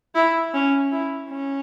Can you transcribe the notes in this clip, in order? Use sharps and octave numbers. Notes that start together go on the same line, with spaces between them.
E4
C#4
E4
C#4